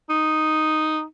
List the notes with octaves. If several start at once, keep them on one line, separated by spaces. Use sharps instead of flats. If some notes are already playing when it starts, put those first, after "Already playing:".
D#4